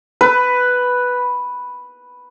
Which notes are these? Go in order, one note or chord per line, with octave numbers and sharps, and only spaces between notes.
B4